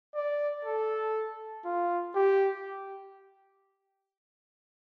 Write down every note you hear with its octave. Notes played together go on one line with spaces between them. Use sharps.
D5
A4
F4
G4